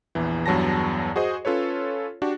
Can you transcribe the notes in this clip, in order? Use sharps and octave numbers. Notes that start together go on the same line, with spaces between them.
A#1 E2 E3
E2 G2 F#3 A5 A#6
F#4 G#4 C5 D#5
C#4 F4 A4 B4 C#5
D4 F#4 G4